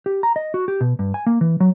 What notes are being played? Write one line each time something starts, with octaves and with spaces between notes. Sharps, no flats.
G4
A#5
D#5
F#4
G4
B2
G2
G#5
A#3
E3
F#3